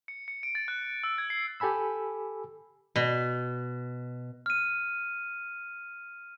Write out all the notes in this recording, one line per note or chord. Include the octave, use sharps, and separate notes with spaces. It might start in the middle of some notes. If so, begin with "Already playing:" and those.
C#7
C#7
D7
A6
F#6
F#6
E6
G#6
C7
G4 A4 G#5 B5 E6
B2
F6 D#7